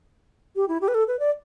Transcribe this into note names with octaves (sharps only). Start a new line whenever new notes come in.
G4
E4
G4
B4
A4
B4
D5